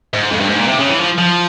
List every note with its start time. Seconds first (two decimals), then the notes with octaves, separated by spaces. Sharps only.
0.13 G#2
0.31 F2
0.40 G2
0.49 G#2
0.57 A#2
0.67 C3
0.79 C#3
0.89 E3
1.00 F3
1.18 F3